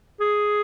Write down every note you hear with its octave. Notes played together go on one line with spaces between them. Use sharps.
G#4